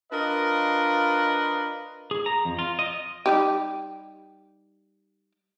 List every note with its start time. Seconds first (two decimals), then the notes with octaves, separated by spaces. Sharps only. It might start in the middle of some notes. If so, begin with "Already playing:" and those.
0.12 D4 F4 A#4 B4 D#5
2.11 G#4
2.26 A#5
2.45 F2
2.59 F4
2.79 D#5
3.26 G3 D#4 G4